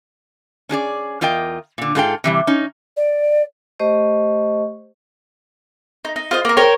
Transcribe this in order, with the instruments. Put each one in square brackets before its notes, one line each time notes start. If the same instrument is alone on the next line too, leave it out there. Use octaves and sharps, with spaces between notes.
[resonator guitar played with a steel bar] C#4 D4 G#4 D5
E2 F4 A#4 D#5 G5
A#2 D3
G#2 F4 G#4 A4 F5 G5
C3 E3 G3
C#4 D#4
[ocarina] D5
[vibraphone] A3 G4 C5 D#5 C#6
[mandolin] D#4
D#4
F4 C5 D#5
A#3 A#4
A#4 C5 C#5 G5